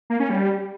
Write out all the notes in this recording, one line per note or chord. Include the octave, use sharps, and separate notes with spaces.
A#3
C#4
G3